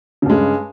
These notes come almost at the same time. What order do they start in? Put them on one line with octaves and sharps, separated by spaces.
C#3 G2 G#3